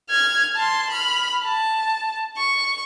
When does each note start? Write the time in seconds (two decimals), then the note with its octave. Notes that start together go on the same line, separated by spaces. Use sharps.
0.10 F6 G#6
0.56 A5 C6
0.90 B5 F6
1.45 A5
2.37 C#6